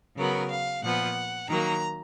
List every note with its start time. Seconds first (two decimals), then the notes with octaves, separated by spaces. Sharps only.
0.16 C#3 F#3 B3 A#4
0.49 F5
0.82 A#2 F3 B3 F#5
1.48 D#3 F#3 A#3 A#5